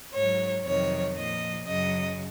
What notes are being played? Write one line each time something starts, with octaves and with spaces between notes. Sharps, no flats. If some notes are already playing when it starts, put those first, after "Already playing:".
G#2 F#3 C#5
F2 C3 D#3 F#3 C#5
A#2 F3 D#5
F#2 C#3 F#3 D#5